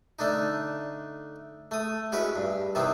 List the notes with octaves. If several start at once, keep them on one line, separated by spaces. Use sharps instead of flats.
D3 A3 D4 D#4
A3 D#6
G#3 C#4 E4 F#4 B4
G2
C3 D#3 E3 B3 C4